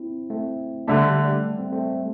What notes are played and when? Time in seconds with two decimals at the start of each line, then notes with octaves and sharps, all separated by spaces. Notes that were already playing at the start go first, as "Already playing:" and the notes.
Already playing: C4 E4
0.30 A3 C4
0.87 D3 G3 A3 B3 D4
1.07 G3
1.25 G3
1.44 A3
1.59 A3 C4
1.72 A3 C4
1.87 A3